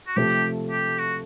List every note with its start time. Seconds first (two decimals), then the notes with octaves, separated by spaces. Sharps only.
0.07 F#4
0.16 C3 F3 A3 G4
0.71 G4
0.98 F#4